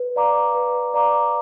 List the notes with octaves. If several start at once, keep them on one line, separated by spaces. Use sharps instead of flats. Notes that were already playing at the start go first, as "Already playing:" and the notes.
Already playing: B4
D5 F5 A#5 D6
B4
D5 F5 A#5 D6